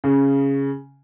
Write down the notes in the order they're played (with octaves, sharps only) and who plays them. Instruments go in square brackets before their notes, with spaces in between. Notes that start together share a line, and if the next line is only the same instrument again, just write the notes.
[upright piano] C#3